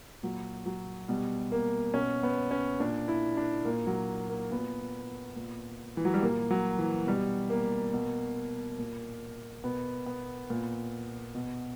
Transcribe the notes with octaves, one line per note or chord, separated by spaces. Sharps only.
A#2 F#3
F#3
B2 G3
A#3
B2 C#4
B3
C#4
A#2 D4
E4
D4
A#2 A#3
F#3
A#3
A#2 B3
A#2
E3
F#3
G3
A#2 A#3
F#3
E3
B2 G3
A#3
B2
A#2
B2 B3
B3
A#2
B2